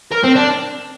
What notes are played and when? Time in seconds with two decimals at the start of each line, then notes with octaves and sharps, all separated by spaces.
0.12 A#4
0.23 C4
0.36 D4